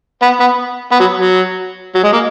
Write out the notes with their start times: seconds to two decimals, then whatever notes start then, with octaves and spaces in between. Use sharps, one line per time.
0.22 B3
0.40 B3
0.92 B3
1.00 F#3
1.17 F#3
1.95 F#3
2.04 G#3
2.12 A#3